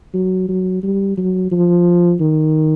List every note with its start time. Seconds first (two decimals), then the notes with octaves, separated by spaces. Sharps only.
0.14 F#3
0.48 F#3
0.83 G3
1.17 F#3
1.51 F3
2.20 D#3